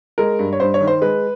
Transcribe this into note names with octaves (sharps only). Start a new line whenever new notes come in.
G#3 A#4
G2
C#5
G2 C5
C#5
D#3
C5
G#3 B4